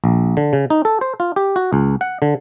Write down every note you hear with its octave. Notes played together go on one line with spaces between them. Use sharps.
A#1
D3
C#3
D#4
A4
C5
F4
G4
F#4
C#2
F#5
D3